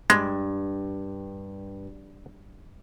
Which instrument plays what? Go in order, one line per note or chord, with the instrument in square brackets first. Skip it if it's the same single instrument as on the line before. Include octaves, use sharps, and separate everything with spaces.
[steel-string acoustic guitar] G2 [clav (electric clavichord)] G#3